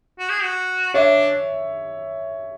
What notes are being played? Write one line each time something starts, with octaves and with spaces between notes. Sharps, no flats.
F#4
G#4
F#4
D4 C#5 E5